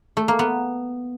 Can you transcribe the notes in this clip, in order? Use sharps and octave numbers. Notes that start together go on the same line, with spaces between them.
A3
A#3
B3